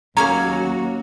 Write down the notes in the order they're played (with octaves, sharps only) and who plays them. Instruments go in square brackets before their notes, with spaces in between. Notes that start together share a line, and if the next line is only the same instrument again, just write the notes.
[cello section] D#2 F#4 [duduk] F#3 [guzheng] A#3 C#4 C#5 [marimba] A#5